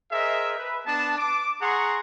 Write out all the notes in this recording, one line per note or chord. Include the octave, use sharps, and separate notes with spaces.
G#4 A#4 C5 D#5 E5
B4
B3 D4 A5
D6
G#4 F#5 A#5 C6 C#6